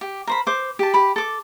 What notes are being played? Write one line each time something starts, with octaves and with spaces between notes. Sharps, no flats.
G4
A#4 C5 B5
C5 D6
G4 A5
G4 B5
A4 D6